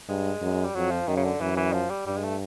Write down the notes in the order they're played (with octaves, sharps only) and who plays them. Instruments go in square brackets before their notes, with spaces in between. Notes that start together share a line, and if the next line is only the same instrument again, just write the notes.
[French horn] G2 [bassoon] G#3
[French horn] F#2
[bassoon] G3
[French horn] F2 [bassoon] F#3
[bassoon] F3
[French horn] F#2 [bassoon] D#3
[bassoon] C#3
D3
[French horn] F#2 [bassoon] E3
[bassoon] E3
F3
G3
[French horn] G2 [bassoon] G3
[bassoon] G#3
A3